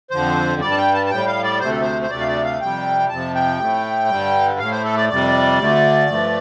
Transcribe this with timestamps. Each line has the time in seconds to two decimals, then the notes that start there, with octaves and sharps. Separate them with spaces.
0.11 F2 D3 F3 C5
0.61 G2 G3 D5
0.72 A5
0.78 G5
0.94 A5
1.06 A5
1.11 A2 G3 G5
1.27 F5
1.44 D5
1.60 D2 C3 A3 C5
1.71 A4
1.81 C5
2.02 C5
2.10 D2 C3 A3 D5
2.20 F5
2.27 D5
2.44 F5
2.61 F2 C3 G3 G5
3.09 F2 C3 F3 A5
3.35 G5
3.60 A2 A3
4.09 G2 D3 G3
4.59 A2 A3 F5
4.71 C5
4.84 A4
4.97 D5
5.09 F2 C3 G3 D5
5.59 D2 D3 A3
6.08 G2 F3 A3